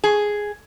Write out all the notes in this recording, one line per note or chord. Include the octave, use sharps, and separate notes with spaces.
G#4